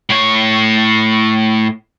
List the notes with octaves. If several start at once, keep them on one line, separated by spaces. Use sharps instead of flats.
A2 C#5